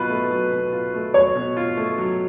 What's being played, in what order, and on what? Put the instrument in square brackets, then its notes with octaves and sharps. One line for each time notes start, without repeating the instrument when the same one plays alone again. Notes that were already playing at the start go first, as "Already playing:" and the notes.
Already playing: [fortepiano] B2 F#3 F4 [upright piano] B4
[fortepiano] A3
F#3
B2
F4
A3
[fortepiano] F#3 [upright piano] C#5
[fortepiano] B2
F4
A3
F#3